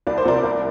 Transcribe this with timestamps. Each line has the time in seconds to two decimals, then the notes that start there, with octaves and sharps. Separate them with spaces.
0.07 C2 D5
0.18 C5
0.25 C3 F3 C4 A#4 D5
0.44 C2